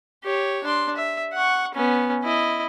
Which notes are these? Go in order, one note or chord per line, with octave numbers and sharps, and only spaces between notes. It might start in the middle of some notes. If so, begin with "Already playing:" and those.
G4 C#5
D4 C6
E5
F#5 C#6
B3 C#4
E4 D#5